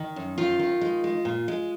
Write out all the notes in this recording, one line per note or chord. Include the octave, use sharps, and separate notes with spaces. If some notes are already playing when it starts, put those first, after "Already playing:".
Already playing: D#3
F#2
D#3 F4
D#3
G#3
G#3
A#2
G#3